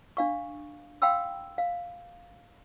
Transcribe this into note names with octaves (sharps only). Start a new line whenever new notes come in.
D4 F5 C#6
F5 G5 B5 C6 E6
F5